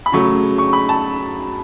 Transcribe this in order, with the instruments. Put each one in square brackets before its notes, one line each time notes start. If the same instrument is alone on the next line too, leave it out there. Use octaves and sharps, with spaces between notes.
[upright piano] B5
C#3 F#3 A3 C#6
C#6
B5
A5